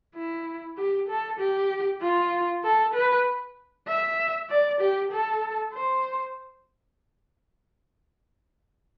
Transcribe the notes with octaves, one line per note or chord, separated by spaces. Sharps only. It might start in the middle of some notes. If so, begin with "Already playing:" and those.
E4
G4
A4
G4
F4
A4
B4
E5
D5
G4
A4
C5